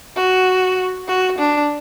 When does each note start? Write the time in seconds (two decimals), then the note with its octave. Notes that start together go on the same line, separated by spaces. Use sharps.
0.17 F#4
1.08 F#4
1.38 D4